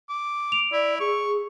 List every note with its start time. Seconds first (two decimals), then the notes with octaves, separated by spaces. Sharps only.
0.09 D6
0.52 D7 F7
0.72 E4 D5
1.00 G#4 C#6